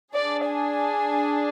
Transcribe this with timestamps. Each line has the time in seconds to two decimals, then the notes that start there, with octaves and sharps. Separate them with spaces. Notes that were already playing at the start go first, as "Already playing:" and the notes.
0.14 D4 G#4 D5
0.47 G#5